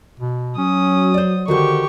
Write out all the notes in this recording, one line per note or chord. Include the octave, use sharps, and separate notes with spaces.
B2
F#3 C#4 D#6
C5 D5
D3 D#3 F#4 G4 C5 C#6